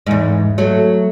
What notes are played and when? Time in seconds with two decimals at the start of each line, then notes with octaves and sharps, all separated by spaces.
0.07 E2 G#2
0.58 F#3 A3